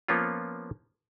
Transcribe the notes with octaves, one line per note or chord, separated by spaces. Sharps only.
F3 A#3 B3 C#4 F4